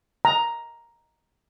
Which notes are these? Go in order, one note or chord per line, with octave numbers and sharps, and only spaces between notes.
A#5